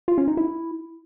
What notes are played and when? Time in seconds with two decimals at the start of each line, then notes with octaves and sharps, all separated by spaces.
0.08 F4
0.18 C#4
0.28 D#4
0.37 E4